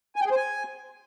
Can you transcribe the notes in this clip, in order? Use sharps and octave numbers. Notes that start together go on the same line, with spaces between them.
G#5
G5
G#4
C5
G#5